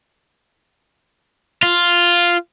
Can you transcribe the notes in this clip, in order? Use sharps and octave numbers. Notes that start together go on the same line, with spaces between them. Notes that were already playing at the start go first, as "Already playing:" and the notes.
F4